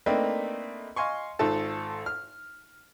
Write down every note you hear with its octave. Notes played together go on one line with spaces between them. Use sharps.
A3 A#3 C4 D4 D#4 B4
D#5 F5 G#5 C6 C#6
G#1 G#2 F4 A4 A5
F6